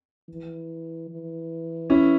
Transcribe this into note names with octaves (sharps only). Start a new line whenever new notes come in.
E3
E3
C#4 E4